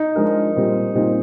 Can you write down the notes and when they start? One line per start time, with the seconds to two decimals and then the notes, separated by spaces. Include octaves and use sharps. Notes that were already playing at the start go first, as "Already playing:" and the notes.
Already playing: D#4
0.15 F3 G#3 D4 F4 A#4
0.54 A#2 G3 C4 D#4
0.94 A#2 G3 C4 D#4